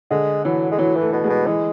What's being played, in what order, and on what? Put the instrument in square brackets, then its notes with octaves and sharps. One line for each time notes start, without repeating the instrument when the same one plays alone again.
[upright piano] D3 [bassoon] G#3
[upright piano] E3 [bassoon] F#3
[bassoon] G#3
[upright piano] E3 [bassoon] F#3
[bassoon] E3
[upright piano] A3
[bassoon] B2
[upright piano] G#3
[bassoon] B2
[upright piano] E3 [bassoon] G#3